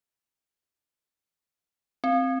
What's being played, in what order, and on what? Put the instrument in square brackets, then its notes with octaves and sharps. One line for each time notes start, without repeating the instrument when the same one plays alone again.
[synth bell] C4